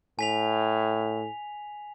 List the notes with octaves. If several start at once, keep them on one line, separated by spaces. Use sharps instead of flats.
A2 G#5 B6 F7